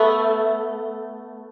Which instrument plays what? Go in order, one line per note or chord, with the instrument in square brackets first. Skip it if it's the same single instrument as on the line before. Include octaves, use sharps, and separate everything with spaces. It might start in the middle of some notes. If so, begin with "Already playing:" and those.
Already playing: [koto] A3 B3